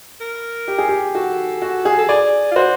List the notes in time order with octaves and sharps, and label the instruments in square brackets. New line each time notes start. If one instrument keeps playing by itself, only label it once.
[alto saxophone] A#4
[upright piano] G4
G#4
G4
[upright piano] F#4 [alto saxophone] A4
[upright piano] F#4
G#4
[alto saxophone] A4
[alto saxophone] G#4 [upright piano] D5
[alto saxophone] F4
[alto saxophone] F#4 [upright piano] C5